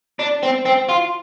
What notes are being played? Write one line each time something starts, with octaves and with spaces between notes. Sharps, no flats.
D4
C4
C4
F4